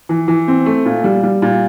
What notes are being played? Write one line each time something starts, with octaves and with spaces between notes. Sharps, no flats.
E3
E3
C4
A3
A#2
G3
G3
A#2